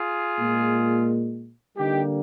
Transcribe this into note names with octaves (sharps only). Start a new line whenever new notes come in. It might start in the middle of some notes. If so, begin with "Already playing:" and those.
Already playing: F4 G#4
A#2 G#3
D3 G3 A#3 D#4 G4